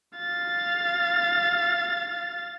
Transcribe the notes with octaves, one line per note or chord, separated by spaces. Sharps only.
F5 A6